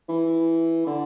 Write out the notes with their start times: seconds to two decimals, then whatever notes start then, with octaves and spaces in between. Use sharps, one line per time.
0.09 E3
0.87 D3